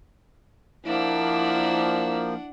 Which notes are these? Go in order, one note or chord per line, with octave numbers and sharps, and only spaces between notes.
F3 A#3 D4 E4 F#5 E6